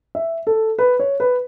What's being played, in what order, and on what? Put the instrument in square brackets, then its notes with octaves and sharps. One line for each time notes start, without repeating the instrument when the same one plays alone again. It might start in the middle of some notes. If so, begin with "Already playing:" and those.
[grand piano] E5
A4
B4
C#5
B4